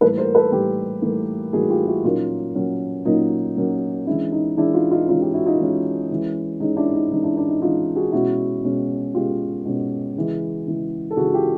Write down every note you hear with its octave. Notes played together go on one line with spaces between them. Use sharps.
A2 E3 G3 A#3 A4 B4
A#4 C5
A4 B4
A2 E3 G3 A#3 G4 A4
A2 E3 G3 A#3
A2 E3 G3 A#3 F#4 G#4
F4 G4
E4 F#4
A#2 F#3 A#3 C#4 D#4 F4
A#2 F#3 A#3 C#4
A#2 F#3 A#3 C#4 D#4 F4
A#2 F#3 A#3 C#4
E3 G#3 C#4 D4 E4
D#4
E3 G#3 C#4 D4 E4
D#4 F4
D#4 F4
E3 G#3 C#4 D#4 F4
F4 G4
E4 F#4
D#4 F4
E3 G#3 C#4
E3 G#3 C#4
E3 G#3 C#4 D#4
D4 E4
D#4
E3 G#3 C#4 D#4
D4 E4
D4
D#4
E3 G#3 C#4 D#4 F4
F#4 G#4
B2 G#3 C#4 E4 F#4
B2 G#3 C#4
B2 G#3 C#4 F4 G4
B2 G#3 C#4
C#3 E3 G#3
C#3 E3 G#3
A4
C#3 E3 G#3 F#4 G#4
F4 G4